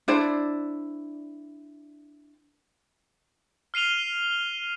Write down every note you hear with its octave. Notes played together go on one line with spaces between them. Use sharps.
D4 E4 C5 D5
F6 C7 D#7 F7 G7